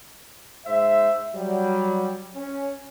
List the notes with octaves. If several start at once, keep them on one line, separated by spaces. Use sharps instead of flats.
G#2 C5 E5
F#3 G3
C#4